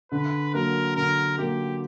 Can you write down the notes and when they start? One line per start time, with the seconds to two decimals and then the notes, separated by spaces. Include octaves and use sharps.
0.12 D3 B4
0.54 F#3 A#3 A#4
0.96 D3 A#4
1.38 F#3 A#3 G4